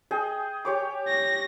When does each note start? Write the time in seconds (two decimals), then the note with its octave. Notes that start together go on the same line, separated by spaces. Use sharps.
0.11 G#4 D#5 G5
0.65 G4 C#5 D6
1.08 A#6